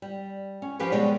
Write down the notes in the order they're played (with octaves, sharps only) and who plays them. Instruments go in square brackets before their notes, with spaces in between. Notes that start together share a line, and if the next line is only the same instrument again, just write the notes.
[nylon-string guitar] G3
C#4
F3 C#4 G4 A#4 B4 F5
B2 G3 G#3 G4 C#5 D5